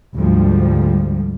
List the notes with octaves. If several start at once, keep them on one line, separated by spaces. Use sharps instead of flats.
D2 G#2 F3 G3